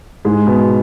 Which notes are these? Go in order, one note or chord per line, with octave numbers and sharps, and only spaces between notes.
G#2 G#3
B2 B3